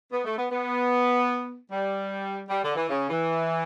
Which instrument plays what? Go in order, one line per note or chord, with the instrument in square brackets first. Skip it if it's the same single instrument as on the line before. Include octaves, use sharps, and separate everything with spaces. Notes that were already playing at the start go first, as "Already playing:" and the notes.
[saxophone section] B3
A3
B3
B3
G3
G3
D3
E3
C#3
E3